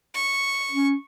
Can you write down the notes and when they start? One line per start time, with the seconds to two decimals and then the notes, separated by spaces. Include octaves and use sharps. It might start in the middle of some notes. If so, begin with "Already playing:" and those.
0.14 C#6
0.71 C#4